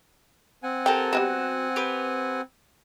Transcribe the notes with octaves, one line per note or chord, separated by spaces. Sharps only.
C4 F#5 G#5
G4 A4 A#4 G5
G3 G#3 B3 F#4
G4 B4